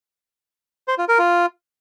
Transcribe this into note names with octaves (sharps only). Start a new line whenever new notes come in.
C5
F4
A#4
F4